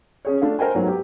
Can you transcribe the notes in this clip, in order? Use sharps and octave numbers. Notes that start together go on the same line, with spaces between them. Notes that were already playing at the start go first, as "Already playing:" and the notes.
C#4 G#4 C#5
A3 D4 F4 A4
A#4 C5 G5 G#5
G#2 F#3 A3 B3
G4